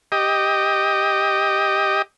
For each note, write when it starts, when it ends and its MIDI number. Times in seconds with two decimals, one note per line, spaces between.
0.12 2.02 67
0.12 2.02 75